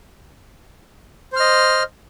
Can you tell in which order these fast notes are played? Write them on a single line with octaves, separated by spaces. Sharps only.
C5 F6 D#5